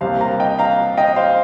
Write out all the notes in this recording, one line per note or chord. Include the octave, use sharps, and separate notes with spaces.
C2 C3 G3 A#3 C5 F5
F5 A#5
D#5 G5
F5 A#5
D#5 G5
C5 F5